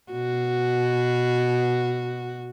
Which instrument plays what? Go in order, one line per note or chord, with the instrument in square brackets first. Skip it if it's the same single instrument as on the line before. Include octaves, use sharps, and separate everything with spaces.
[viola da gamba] B2 F#4